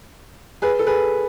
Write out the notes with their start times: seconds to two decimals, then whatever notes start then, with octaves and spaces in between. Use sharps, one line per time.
0.62 G#4 B4
0.79 A4
0.87 G#4 B4